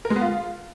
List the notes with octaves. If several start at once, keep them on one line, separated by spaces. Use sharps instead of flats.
A#4
G#3
B3
F4